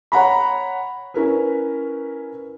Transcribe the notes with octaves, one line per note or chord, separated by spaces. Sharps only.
C#5 F#5 A#5 B5
C#4 E4 A#4 B4